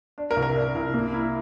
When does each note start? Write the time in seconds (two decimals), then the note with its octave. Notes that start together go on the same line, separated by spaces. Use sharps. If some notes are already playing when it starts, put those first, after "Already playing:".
0.18 D4
0.31 A#4
0.36 C2
0.42 A#4
0.56 D4
0.75 C2
0.94 A#3
1.13 E4